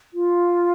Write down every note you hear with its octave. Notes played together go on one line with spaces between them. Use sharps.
F4